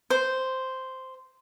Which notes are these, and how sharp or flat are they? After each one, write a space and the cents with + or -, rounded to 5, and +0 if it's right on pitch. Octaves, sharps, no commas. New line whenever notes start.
C5 -5